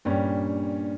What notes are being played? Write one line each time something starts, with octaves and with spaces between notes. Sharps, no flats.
G2 A#2 G3 C#4